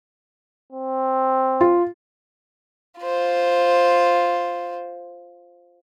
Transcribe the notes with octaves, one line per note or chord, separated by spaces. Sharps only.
C4
F4
F4 C5